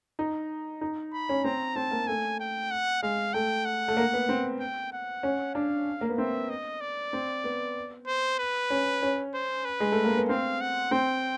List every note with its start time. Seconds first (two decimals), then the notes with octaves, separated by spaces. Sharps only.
0.19 D#4
0.81 D#4
1.13 B5
1.29 C#4
1.44 C4 A#5
1.76 C4 A5
1.91 A#3
2.07 A3 G#5
2.40 G5
2.71 F#5
3.02 G#3 F5
3.33 A3 G5
3.65 F#5
3.88 A3
3.97 A#3
4.13 B3
4.29 C4
4.60 G5
4.93 F#5
5.23 C#4
5.55 D4 F5
6.01 A#3
6.09 B3
6.18 C4 E5
6.49 D#5
6.81 D5
7.13 C4
7.44 B3
8.07 C5
8.39 B4
8.70 C#4
9.02 C#4
9.34 C5
9.65 B4
9.80 G#3
9.92 A3
10.04 A#3
10.17 B3
10.29 C4 F5
10.61 F#5
10.91 C4 G5